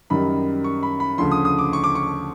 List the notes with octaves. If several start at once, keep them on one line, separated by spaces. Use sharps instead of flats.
F#2 D#3 G3 B5
C#6
B5
B5
D2 C#3 F3 C6
D#6
D#6
D6
C#6
D6
C#6